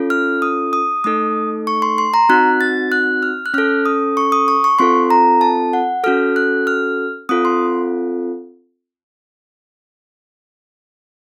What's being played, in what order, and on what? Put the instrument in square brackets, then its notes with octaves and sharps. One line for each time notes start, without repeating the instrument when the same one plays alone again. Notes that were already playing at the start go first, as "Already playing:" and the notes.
Already playing: [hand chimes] C#4 F4 A4
F6
D#6
D#6
A3 D#4 A4 D#6
C#6
C6
C6
A#5
C4 D#4 F#4 F#6
A6
F#6
F6
F#6
C#4 A4 F6
D#6
C#6
D#6
C#6
C#6
C4 F4 A4 C6
A#5
A5
F#5
C#4 F#4 A4 F6
F#6
F6
C4 F4 A4 D#6
C6